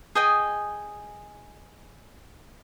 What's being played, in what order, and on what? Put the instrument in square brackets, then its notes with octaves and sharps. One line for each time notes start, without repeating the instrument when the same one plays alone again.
[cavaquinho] G#4 D#5 G5 G#5